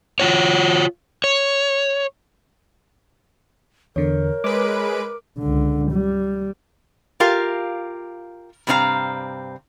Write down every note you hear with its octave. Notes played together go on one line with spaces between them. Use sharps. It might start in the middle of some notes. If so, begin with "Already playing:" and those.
F4 F#4 C#5
C#5
E2 D3 A#4 C#5
G#3 B4 D6 D7
C#2 D3
G3
F4 G4 A#4 F5
G2 C3 C4 C#4 F5 A#5